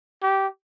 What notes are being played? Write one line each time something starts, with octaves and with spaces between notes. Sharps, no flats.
G4